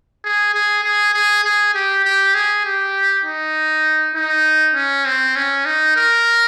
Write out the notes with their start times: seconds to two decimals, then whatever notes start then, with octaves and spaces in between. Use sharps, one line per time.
0.24 G#4
0.54 G#4
0.84 G#4
1.14 G#4
1.44 G#4
1.74 G4
2.05 G4
2.34 G#4
2.65 G4
3.25 D#4
4.16 D#4
4.75 C#4
5.05 C4
5.35 C#4
5.66 D#4
5.96 A#4